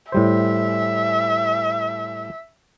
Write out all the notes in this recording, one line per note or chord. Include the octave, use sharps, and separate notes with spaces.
A2 G3 C5 E5